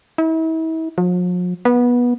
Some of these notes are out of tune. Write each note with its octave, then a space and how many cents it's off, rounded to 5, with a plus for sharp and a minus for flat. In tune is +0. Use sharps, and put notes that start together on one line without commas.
E4 -40
F3 +45
B3 -20